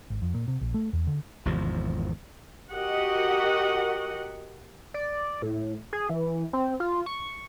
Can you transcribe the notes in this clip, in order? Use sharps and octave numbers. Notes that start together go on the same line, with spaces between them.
G#1
F2
A#2
C3
A#1
A3
E2
D3
G#1 E2 C3 F3
F#4 G4 A#4 D#5 F#5
D5
A2
G#4
E3
C4
F4
C#6